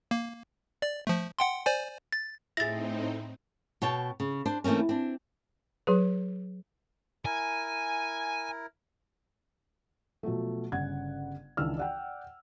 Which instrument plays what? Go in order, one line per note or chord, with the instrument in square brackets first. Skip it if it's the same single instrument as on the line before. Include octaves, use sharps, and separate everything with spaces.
[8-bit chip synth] A#3
D5
F3 A3
F#5 G5 C6
C5 D5 G#5
A6
[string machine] A2 C4 D#4 [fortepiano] E4 G#4 [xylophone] A6 A#6
[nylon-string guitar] B2 C#5 G5 A5
C#3
D4 C5
E3 A3 A#3 C4 C#4
C4 D4
[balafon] F#3 G#4 B4
[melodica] E4 A#4 [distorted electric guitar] G#5
[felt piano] B2 F3 F#3 A3
G1 C#3 F#5 G#6
C#2 D#3 E3 D4 E6 F6
D5 F#5 G5